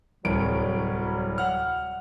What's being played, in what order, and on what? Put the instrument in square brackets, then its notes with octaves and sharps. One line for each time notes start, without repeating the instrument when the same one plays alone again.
[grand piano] D1 C2 D7 [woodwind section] F#3 G3
[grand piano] F#5 F6